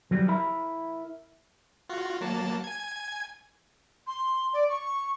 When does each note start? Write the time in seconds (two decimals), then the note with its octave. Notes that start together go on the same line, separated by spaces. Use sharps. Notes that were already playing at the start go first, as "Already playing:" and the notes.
0.11 E3 F#3 G3
0.28 E4 A#4 E5 B5
1.89 F4 F#4
2.21 F#3 A#3 A5
2.64 G#5 G#6
4.06 C6
4.53 D5
4.69 C#6